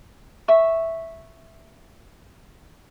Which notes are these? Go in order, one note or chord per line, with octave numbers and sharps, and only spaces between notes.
E5 C#6